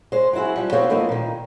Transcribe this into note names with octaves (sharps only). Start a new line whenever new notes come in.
G#3 C5
F#3 C4 E4 F#4 G#4
F3 G3
B3 C4 F#4 C5 C#5 F5
E3 F3 A3 A#3 C4 D#4
A#2 D#3